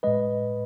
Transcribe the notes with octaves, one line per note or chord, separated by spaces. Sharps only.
A2 G#3 B4 D#5